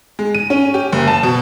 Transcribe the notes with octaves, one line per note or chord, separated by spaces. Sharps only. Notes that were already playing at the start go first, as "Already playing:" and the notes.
G#3
D#7
C#4
G4
F#1
A5
B2